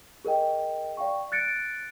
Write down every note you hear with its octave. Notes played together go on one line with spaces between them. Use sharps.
G#4 A#4 D#5 G5
D5 F5 G5 C#6
F#6 A6 C#7 D7